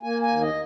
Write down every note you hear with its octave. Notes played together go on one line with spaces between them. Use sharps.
A#3 G#5
G#5
D#2
D#5